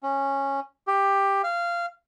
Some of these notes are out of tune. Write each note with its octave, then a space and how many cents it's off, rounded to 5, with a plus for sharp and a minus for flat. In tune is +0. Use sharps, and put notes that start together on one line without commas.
C#4 -10
G4 +10
F5 -15